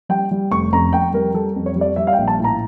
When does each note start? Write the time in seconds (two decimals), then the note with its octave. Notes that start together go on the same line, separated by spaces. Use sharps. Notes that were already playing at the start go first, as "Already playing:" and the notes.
0.09 G3 G5
0.31 G3
0.51 F1 C#6
0.72 F2 A#5
0.93 F2 G5
1.13 G3 A#4
1.34 G3 A4
1.56 F2
1.66 C#5
1.76 G3
1.81 D5
1.96 G3 E5
2.07 F5
2.13 G5
2.18 A#1
2.28 A5
2.39 A2
2.44 A#5